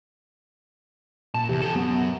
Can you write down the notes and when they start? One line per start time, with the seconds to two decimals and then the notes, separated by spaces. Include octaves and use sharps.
1.34 A#2 A5
1.49 E2 C3
1.62 G4 A4 A5
1.75 F#2 B3